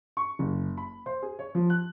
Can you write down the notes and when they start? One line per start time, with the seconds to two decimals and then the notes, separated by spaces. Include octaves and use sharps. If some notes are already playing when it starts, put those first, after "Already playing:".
0.17 C#6
0.39 F#1
0.77 B5
1.06 C5
1.22 G#4
1.39 C#5
1.55 F3
1.70 F#6